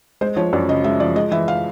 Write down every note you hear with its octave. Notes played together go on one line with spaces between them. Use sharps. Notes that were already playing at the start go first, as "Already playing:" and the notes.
G#3 C5
F3 C#5
F#2 D5
C#3 D#5
G#3 E5
F3 D5
G#3 D#5
E3 E5
F5